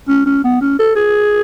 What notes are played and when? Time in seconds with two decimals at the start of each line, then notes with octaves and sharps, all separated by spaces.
0.08 C#4
0.26 C#4
0.44 B3
0.61 C#4
0.79 A4
0.96 G#4